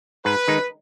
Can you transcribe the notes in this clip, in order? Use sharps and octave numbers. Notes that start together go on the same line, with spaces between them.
G#2 B4
D#3 G#3 D#4